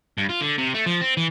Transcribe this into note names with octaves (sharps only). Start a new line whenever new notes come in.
G2
F4
D3
C3
A3
F3
C4
E3